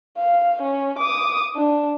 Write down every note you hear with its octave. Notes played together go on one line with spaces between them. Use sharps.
F5
C#4
D6 D#6
D4